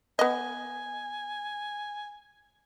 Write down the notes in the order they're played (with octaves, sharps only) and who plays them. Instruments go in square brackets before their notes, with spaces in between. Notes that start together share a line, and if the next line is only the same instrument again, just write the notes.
[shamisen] B3 D#5 [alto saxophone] G#5